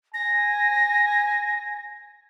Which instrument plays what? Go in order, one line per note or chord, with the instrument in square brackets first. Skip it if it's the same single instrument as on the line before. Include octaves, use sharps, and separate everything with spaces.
[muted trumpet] G#5 [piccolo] A#6